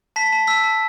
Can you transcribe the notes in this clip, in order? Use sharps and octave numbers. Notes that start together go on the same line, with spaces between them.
A5 B6
A5
E6 B6
A5